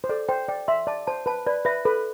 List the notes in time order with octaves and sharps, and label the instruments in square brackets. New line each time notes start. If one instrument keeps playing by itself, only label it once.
[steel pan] C5
[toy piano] A4 [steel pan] D5
[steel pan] C5 [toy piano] G5
[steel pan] D5 [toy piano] G5
[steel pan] E5 [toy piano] C6
[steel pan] D5 [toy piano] A5
[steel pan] C5 [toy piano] A5
[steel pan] B4 [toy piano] A5
[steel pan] B4 [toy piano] D5
[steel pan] B4 [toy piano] E5
[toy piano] A4 [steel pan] B4